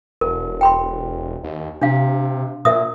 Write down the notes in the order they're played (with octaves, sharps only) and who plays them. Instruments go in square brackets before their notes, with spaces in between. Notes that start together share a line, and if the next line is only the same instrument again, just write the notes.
[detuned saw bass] E1 [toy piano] A#4
[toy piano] G5 B5 C6
[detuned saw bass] D#2
[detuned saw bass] C3 [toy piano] D4 F5
[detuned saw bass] A#2 [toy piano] A#4 E5 D#6